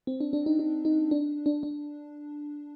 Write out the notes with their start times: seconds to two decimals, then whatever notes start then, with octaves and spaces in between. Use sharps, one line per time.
0.07 C4
0.20 D4
0.33 D4
0.46 D#4
0.59 D#4
0.85 D#4
1.11 D4
1.46 D4
1.63 D4